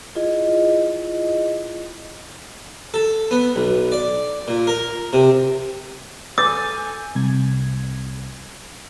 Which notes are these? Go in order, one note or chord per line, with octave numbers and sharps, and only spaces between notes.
E4 F4 G#4 D#5
A4
B3
B1
D5
A#2
A#4
C3
A4 G#5 D6 E6 G6 A6
C2 G#6